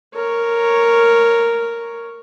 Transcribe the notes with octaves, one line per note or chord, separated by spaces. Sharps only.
A#4 C#5